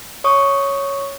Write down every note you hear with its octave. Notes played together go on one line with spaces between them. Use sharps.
C#5 C#6 D#6